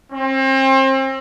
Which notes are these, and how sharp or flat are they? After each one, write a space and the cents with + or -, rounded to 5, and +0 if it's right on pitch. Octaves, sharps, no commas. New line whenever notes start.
C4 +35